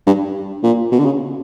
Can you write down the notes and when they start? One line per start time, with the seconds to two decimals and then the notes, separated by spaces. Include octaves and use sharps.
0.07 G2
0.63 A#2
0.92 B2
0.99 D3
1.06 C#3